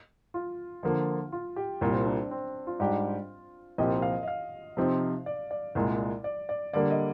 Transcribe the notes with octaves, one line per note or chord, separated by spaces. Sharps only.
F4
D3 F3 A#3
F4
G4
C2 A#2 G3
C4
D4
C4
F4
G#2 G3 D4 G4
C2 A#2 F3 C4 G4 D#5
F5
D#5
F5
C3 F3 C4 D#4
D5
D5
C2 A#2 G#3
D5
D5
D3 G3 A#3 D5
D#5